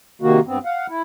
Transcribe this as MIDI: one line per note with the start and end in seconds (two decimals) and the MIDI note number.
0.22 0.40 48
0.22 0.40 51
0.22 0.40 58
0.22 0.40 66
0.46 0.58 43
0.46 0.58 59
0.46 0.58 60
0.65 0.87 77
0.65 0.87 78
0.89 1.02 64